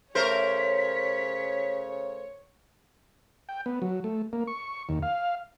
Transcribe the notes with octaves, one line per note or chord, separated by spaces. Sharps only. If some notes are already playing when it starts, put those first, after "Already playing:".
C#3 A3 A#4 C5 C#5 B6
G5
B3
F#3
A3
A#3
C#6
D#2
F5